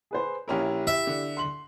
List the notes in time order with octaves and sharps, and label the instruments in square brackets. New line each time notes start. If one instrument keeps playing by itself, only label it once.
[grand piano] G#4 B4 C5
[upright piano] A#1 C#4 A#4 [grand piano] E4 G4
[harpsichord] E5
[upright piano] D3
[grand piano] C6 F#7